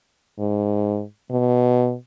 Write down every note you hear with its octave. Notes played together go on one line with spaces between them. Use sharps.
G#2
B2